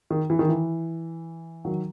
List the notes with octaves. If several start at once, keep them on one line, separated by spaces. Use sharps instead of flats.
D#3
E3
D#3
E3
D#3 F#3